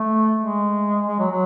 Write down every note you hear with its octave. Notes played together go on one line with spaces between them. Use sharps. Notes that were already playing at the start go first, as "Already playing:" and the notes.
Already playing: A3
G#3
G#3
F#3
F#3